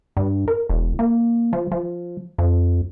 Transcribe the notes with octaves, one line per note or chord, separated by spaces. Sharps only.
G2
A#4
E1
A#3
F3
F3
F2